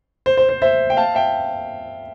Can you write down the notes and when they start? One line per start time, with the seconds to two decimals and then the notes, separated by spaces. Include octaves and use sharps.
0.26 C5
0.37 C5
0.49 C5
0.62 C5 E5
0.90 G5
0.97 F5 A5
1.15 E5 G5